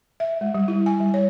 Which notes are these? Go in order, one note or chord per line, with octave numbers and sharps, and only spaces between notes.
E5
G#3
G3
E4
G#5
G3
C#5